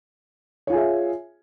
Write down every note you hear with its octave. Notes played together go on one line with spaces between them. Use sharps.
F4 G#4 C#5 E5 G#5